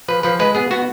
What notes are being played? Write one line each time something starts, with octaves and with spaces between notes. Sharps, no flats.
F3 B4
F3 B4
G#3 B4
B3 G#4
B3 F#4